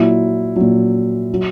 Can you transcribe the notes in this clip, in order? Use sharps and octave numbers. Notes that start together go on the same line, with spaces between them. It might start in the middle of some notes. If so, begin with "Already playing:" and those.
Already playing: A#2 F#3 E4
A#2 F#3
F#3